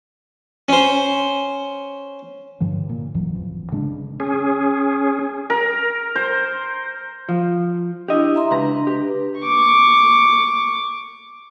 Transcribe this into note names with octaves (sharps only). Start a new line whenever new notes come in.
C#4 C5
G2 D3 F3
A#2
F#1 F2 E3 F#3
A1 F2
C#3 G#3 D4
C#4 G#4
A#4
C5
F3
D4 E4 G4 D#5
E5 A#5 C6
C#2 D4 B4 A#5
G4
C#6 D6